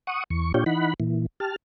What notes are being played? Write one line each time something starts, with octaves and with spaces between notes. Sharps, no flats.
F#5 C#6 D#6
E2 C#6
A#2 D4 F4 G4 C#5 G5
E3 D#4 F#5 B5
A#2 E3
G4 A5 F6